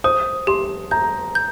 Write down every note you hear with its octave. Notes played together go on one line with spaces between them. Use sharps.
C5 D#6
G4 C6
A#5 G6
G6